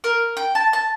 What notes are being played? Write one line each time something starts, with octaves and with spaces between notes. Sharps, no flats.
A#4
G5
A5
A5